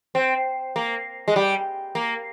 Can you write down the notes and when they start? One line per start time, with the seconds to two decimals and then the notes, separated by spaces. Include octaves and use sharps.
0.15 C4
0.76 A#3
1.28 G#3
1.36 G3
1.95 A#3